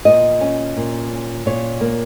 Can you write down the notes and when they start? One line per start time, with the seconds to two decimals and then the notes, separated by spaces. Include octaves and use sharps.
0.05 A#2 D#5
0.41 C#4
0.77 A#2
1.12 C#4
1.46 A#2 C#5
1.81 A#3